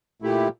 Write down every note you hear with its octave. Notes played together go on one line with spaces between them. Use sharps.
A#2 A3 E4 G4